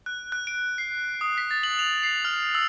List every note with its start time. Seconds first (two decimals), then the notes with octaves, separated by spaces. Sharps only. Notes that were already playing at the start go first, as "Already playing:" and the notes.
0.06 F#6
0.32 F#6
0.47 D7
0.78 C7
1.21 D#6
1.38 B6
1.51 A6
1.63 F#7
1.79 F7
2.03 C7
2.25 F6
2.55 E6